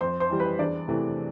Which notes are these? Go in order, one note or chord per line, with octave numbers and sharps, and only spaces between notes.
F2 C5 C6
C5 C6
E3 G3
B4 B5
E2 D4 D5
C3 E3 A3